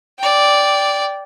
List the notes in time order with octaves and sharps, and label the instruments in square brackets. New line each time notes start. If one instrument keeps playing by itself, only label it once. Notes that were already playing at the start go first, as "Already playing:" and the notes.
[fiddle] D5 G5